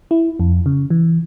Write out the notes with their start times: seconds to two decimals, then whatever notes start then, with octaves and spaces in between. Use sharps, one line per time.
0.11 E4
0.40 F2
0.66 C#3
0.90 E3